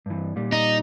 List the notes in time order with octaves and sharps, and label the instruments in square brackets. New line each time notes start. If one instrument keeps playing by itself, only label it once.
[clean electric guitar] G2 E3
A#2 G3
[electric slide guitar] D#4